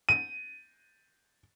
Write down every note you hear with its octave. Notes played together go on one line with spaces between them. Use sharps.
D#7